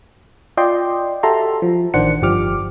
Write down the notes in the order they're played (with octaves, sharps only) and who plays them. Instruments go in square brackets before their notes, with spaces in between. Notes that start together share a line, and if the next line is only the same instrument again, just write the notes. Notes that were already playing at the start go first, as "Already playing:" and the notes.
[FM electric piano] F4 D5 D#5 G5 C6
F#4 G4 A4 E5 A#5 C6
F3
A1 D#3 D4 C5 F#5 C#7
G1 F3 G4 D6 F6